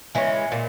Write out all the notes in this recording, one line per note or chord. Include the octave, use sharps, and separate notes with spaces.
E3 G#3 C#4
A#2